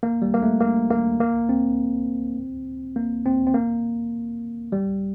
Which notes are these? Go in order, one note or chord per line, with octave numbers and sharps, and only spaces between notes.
A#3
G3
A#3
A3
A#3
A#3
A#3
C4
A#3
C4
C4
A#3
G3